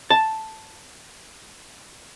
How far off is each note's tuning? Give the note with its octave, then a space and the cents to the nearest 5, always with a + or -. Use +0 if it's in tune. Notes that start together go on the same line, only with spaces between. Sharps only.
A5 +0